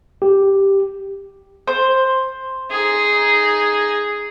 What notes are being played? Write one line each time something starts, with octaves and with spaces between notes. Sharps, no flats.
G4
C5
D#4 G#4